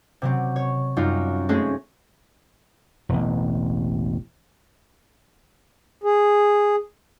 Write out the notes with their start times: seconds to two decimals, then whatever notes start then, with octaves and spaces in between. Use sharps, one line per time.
0.22 C3 F#3 C4
0.56 C#5
0.96 F#2 G3 D#4 F4
1.49 G#3 A3 C4 C#4 G#4
3.09 E1 A1
6.04 G#4